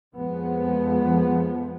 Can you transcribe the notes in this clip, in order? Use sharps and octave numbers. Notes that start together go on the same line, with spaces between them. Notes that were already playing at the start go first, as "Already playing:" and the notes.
F2 F3 G#3 B3